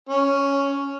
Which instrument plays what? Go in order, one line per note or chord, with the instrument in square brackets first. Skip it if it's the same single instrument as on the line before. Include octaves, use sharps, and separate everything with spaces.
[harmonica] C#4